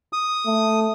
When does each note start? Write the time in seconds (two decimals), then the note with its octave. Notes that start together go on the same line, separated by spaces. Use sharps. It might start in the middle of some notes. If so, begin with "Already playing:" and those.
0.13 D#6
0.46 A3